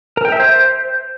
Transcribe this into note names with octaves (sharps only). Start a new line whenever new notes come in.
A#4
G5
E5
C5